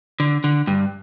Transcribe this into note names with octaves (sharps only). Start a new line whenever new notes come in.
D3
D3
G2